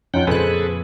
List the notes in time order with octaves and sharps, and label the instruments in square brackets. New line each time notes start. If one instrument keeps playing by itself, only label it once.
[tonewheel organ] F2 F#5 G5 [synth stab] C#4 D#4 F4
[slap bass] F2 A#2 C#3 [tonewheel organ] G#4 A4 B4 [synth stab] C5 F#6